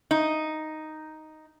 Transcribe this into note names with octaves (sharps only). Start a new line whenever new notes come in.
D#4